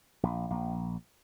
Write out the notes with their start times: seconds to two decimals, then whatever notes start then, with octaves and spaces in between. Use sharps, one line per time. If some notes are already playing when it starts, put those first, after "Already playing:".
0.23 A#1
0.51 A#1